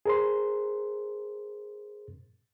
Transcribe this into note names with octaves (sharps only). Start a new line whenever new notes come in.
G#4 A#4 C5 C6